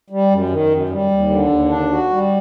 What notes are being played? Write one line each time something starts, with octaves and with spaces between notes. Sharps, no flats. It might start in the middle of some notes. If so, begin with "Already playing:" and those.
G3
F#2
D#3
F#2
G3
D#2
D3
D#2
D4
F#4
G3